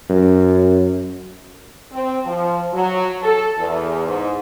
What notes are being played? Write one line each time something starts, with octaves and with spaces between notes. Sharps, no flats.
F#2
C4
F3
F#3
A4
E2
G#2